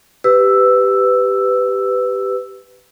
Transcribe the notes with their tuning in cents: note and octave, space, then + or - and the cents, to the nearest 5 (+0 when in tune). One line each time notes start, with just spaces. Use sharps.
G4 -5 B4 +15 E6 +0